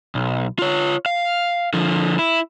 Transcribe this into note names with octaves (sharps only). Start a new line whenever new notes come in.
B1
F4 C#5
F5
D3 F3
E4